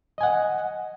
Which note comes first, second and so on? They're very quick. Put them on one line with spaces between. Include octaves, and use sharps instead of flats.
D#5 G#5 F#5